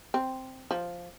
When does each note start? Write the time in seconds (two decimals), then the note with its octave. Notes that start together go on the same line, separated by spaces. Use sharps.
0.14 C4
0.71 F3